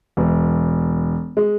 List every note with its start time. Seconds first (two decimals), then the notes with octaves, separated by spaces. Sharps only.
0.17 E1
1.37 G#3